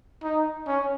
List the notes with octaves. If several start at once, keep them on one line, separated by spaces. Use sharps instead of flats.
D#4
C#4